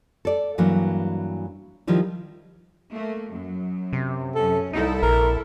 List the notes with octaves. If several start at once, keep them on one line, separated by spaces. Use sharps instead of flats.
A4 D5
G2 E3 F#3 A#3
D#3 F3 G3 E4
A3 A#3
F#2 F#3
C3
F#2 C#4 A4
C2 C3 D#4 E4 A4
A#1 A#4